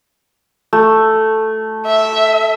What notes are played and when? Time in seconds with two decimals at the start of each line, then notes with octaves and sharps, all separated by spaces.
0.73 A3
1.86 E5